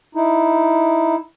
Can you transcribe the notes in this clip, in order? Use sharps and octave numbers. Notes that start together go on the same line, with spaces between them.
D#4 E4